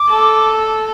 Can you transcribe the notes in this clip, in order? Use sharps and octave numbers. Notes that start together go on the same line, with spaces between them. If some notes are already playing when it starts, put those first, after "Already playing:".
Already playing: D6
A4